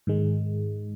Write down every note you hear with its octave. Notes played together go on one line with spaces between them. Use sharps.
G#2 D#3 G#3